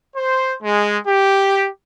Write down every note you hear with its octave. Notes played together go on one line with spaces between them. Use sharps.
C5
G#3
G4